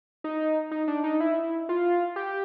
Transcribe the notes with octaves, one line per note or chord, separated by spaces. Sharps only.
D#4
D#4
D4
D#4
E4
F4
G4